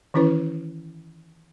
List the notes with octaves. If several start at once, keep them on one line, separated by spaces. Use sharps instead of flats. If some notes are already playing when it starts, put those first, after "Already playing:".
D#3 E3 C#4 E4 B4